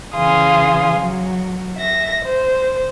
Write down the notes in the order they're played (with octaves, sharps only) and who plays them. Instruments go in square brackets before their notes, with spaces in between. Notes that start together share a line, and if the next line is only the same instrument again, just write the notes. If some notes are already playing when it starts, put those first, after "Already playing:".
[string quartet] C#3 E3 F5 G#5 C6 D#6
F#3
E5 A#6
C5